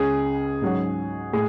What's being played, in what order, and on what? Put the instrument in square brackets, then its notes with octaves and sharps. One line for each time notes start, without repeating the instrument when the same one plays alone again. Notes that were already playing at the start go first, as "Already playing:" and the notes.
Already playing: [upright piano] C#2 C#3 G#3 [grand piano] G#4
[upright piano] G#2 F#3 C#4 F#4
[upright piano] A2 [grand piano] G#4